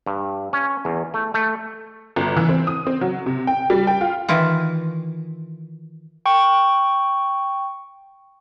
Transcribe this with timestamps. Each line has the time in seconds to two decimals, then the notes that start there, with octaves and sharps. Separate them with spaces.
0.06 G2
0.53 C#4
0.85 E2
1.14 A3
1.34 A3
2.16 G1
2.36 E3
2.49 C4
2.67 D#6
2.87 C4
3.01 F#3
3.26 C3
3.47 G5
3.70 G3
3.87 G5
4.01 F4
4.28 D#3 E3 E4 F4
6.26 G5 C#6